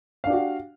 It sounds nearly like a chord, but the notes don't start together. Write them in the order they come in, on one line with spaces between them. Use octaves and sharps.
F5 D4 G4 F#4